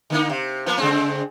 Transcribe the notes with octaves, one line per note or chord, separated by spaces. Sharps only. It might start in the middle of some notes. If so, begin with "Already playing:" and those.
D3 A#3 D#4
C3
F3 A#3 B3
C#3 G#3 C4